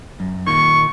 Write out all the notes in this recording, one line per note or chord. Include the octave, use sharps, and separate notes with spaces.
F#2
D#2 A#2 D#3 C#6